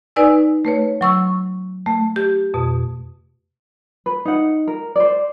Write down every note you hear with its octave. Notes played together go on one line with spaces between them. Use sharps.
D#4 B4 D5 G#5 E6
A3 B4 C#5
F#3 C#6 E6
A3
G4
F2 B2
B4
D#4 F#5
A#4
C5 D5